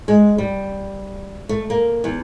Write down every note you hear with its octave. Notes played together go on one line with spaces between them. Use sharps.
G#3
G3
A3
A#3
E2